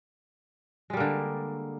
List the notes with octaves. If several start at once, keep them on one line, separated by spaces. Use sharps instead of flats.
D3 G3 G#3 A#3